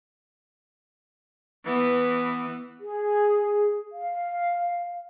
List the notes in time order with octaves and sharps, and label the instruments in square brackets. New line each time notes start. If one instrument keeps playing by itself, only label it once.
[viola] E3 B3
[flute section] G#4
F5